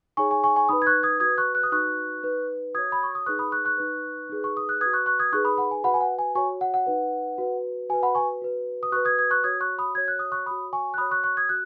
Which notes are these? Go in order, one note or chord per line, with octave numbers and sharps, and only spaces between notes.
D#4 G#4 C#5 G#5 C#6
G#5 C#6
G#5 C#6
G#5 C#6
D#4 B4 B5 D#6
G#6
C#6 F#6
D#6 G#6
F#4 B4 D#6 G#6
C#6 F#6
F#6
D#6
D#4 F#4 B4 C#6 F#6
D#4 B4
F#4 C#5 D#6 G#6
B5
C#6
D#6
D#4 G#4 B4 C#6 F#6
B5 D#6
C#6 F#6
C#6 F#6
D#4 B4
D#4 G#4 B4
C#6
D#6
F#6
B4 D#6 G#6
F#4
C#6 F#6
C#6 F#6
D#6 G#6
D#4 G#4 B4 C#6 F#6
B5 D#6
F#5 B5
G#5
F#4 B4 F#5 B5
G#5
F#5
G#5
F#4 C#5 G#5 C#6
F#5
F#5
D#4 B4
F#4 B4
F#4 B4 G#5
F#5 B5
G#5 C#6
F#4 B4
D#6
F#4 B4 C#6 F#6
D#6 G#6
D#6 G#6
C#6 F#6
F#4 C#5 D#6 G#6
C#6 F#6
B5 D#6
F#4 C#5 G#6
F#6
D#6
C#6 F#6
F#4 C#5 B5 D#6
G#5 C#6
F#6
F#4 C#5 B5 D#6
C#6 F#6
C#6 F#6
D#6 G#6
F#4 F#6